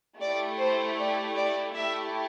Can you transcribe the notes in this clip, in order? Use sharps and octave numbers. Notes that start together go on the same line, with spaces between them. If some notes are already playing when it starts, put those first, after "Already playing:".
A3 E4 G4 D5
C5
D5
D5
A3 E4 G4 E5